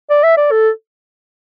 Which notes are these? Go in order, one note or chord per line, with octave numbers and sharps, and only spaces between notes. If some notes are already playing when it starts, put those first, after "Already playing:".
D5
E5
D5
A4